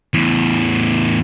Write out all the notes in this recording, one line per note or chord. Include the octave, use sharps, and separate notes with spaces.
E2 A2